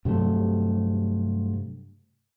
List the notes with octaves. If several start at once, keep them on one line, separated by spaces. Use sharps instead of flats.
G2 C3 F#3 A3